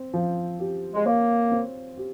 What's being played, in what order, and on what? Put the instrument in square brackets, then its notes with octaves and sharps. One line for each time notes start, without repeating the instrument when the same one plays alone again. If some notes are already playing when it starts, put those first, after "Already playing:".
Already playing: [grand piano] C4
F3
G4
[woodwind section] G#3
[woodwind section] A#3 [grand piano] C#5
[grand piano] C4
G4